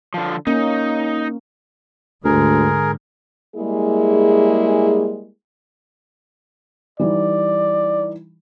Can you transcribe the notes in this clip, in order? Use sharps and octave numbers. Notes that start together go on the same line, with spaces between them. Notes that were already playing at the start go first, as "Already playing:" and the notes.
D3 F3
A#3 C#4 D#4
D2 G#2 D3 G#4 A#4
G3 G#3 A#3 E4 G#4
E3 G3 D#4 D5